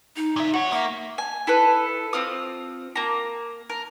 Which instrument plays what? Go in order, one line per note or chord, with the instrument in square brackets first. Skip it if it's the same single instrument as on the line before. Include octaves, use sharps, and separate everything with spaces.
[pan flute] D#4
[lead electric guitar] A#2 E5
[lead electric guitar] F#4 C#5 [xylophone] F#5
[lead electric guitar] A#3 [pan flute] E5
[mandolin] G#5
E4 A4 B4
C4 F4 D#6
A#3 A#5
A#4